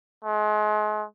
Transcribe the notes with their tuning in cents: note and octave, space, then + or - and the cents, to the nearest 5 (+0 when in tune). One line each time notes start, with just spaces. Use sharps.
G#3 +35